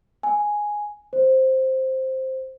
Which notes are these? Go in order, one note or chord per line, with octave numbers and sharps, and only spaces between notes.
G#5
C5